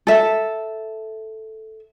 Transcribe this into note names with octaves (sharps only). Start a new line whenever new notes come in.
A4 E5